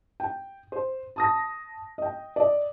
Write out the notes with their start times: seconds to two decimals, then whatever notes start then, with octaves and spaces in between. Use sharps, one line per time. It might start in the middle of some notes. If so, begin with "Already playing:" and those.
0.20 G5
0.72 C5
1.16 A5 D#6 A#6
1.98 D#5 G5
2.36 D5 D#5